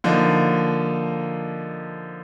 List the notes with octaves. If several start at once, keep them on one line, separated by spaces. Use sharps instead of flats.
D3 F3 A#3 D#4